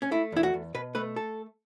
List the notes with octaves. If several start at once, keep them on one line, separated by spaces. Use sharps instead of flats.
C#4
A3 E4
E2 E4
F#4
E2
B2 B4
A3 B4
A4